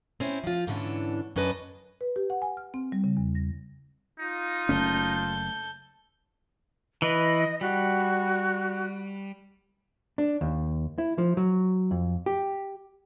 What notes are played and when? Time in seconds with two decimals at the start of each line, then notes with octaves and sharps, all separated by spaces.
0.20 C4 C#4 E4
0.44 F3 F4
0.67 G#2 D3 E3 C#4 D4
1.36 F#2 C#4 D4 B4 D#5
2.01 B4
2.16 G4
2.30 F#5
2.42 G#5
2.57 F6
2.74 C4
2.92 G3
3.04 C#3
3.17 E2
3.35 A#6
4.19 D#4 F4
4.69 F#1 A3 C#4 A4 G6
7.02 E3 B4 D#5
7.61 G3 F#4
10.18 D4
10.41 D#2
10.98 E4
11.18 F3
11.37 F#3
11.91 F2
12.26 G4